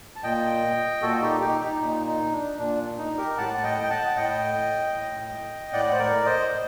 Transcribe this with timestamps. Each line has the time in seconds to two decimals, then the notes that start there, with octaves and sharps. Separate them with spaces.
0.16 A5
0.23 A#2 D#5 G5
1.02 A#2 F#4 A4
1.21 D#4 G4
1.41 D#4 G4
1.61 D#4
1.80 A#2 D#4
2.07 D#4
2.32 D4
2.59 A#2 D4
2.98 D#4
3.17 G4 A#4
3.37 A2 F#5 A5
3.58 A5
3.63 D#5 G5
3.83 G5
3.90 F#5 A5
4.15 A2 D#5 G5
4.94 A2
5.73 A2 D5 F#5
5.92 C5
5.99 A#4 D5
6.26 C5 D#5
6.52 A2